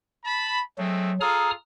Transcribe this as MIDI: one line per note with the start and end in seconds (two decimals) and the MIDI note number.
0.25 0.61 81
0.25 0.61 83
0.78 1.19 54
0.78 1.11 56
0.78 1.11 57
0.78 1.11 60
1.21 1.52 65
1.21 1.52 68
1.21 1.52 69
1.21 1.51 82
1.21 1.51 87
1.21 1.51 89